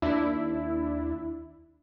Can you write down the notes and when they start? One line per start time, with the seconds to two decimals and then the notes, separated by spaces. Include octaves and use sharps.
0.02 D#2 D4 E4